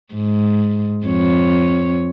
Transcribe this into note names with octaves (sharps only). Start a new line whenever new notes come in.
G#2
F2 C#5